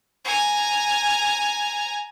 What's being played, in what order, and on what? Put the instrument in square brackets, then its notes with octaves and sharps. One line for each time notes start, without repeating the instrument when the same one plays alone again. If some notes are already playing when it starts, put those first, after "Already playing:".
[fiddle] G#5 A#5